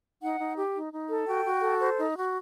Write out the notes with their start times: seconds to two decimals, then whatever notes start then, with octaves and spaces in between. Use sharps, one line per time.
0.22 D#4 F#5
0.40 D#4
0.57 G4
0.74 D#4
0.92 D#4
1.09 A4
1.27 F#4 G5
1.44 F#4
1.62 A4
1.80 C5
1.98 D#4
2.15 F#4